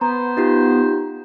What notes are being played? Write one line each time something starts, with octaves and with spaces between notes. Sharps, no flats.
B3 C5 A#5
D#4 F4 G4